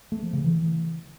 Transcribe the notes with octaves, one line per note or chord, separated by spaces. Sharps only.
A3
F3
C#3
E3